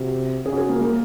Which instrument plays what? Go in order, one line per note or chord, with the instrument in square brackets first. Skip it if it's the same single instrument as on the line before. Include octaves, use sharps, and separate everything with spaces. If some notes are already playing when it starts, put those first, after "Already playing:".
Already playing: [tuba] C3 [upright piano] F#4
[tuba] C#3 [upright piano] G#4
[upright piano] F#4
G#4
A#3
A#3